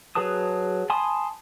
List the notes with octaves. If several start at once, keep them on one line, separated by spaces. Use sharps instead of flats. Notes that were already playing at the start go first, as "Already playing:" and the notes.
F#3 G#4 B4 A5 D#6
G#5 A5 B5 C6 D#6